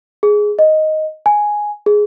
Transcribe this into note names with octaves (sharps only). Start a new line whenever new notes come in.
G#4
D#5
G#5
G#4